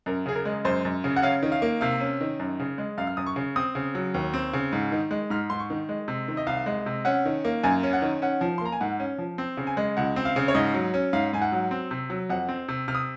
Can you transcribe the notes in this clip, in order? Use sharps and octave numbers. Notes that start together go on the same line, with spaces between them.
F#2 A#4
C#3 G#4
A#4
G#3
F#2 C5
F#2
C#3
F#5
C#4 F5
D#3
F5
A#3
C3 F5
C#4
D#3
F#2
C#3
G#3
F#2 F5
F6
F#2 D#6
C#6
C#3
C4 D#6
C#3
F#3
D#2
C4
C#3
G#2
D#3
G#3
G#2 F6
G#2 C6
C#6
D#3
G#3
C3
D#3
D#5
C2 F5
G#3
C3
C#4 F#5
D#3
A#3
F#2 G#5
C#4
F#5
D#3
C#4 F#5
F3
C6
A#3 A#5
G#5
G#2 F#5
C#4
F3
C4
C#3
G#5
G#3
C#2 F#5
C4
F5
C#3
C#5
G#2 D#5
F#3
C#4
G#2 F5
G#2 G#5
F#5
F#3
C4
C3
F#3
F2 F#5
C4
C3
C3 F6
D#6